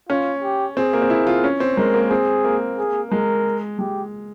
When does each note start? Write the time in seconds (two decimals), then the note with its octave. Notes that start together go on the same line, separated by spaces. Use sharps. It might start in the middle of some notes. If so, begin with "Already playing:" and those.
0.09 C#4 F4
0.42 G4
0.77 C4 G#4
0.93 A#3
1.02 C4
1.10 E4
1.27 F4
1.44 C#4
1.60 C4
1.77 G#3 A#4
1.94 A#3
2.10 C4 G#4
2.45 A#3
2.78 G#4
3.11 G#3 A#4
3.79 G#3 G4